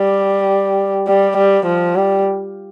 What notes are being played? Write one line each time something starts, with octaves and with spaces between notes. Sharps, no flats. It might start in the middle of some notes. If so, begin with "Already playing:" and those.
Already playing: G3
G3
G3
F3
G3